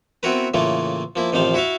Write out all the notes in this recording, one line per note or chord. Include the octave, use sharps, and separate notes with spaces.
B3 C4 E4 F#4 A#4 B4
A2 C#3 E3 A#3 F4
F3 A#3 E4
A1 C3 D#3 F3 C5 F5
E4 F#4 E5 F5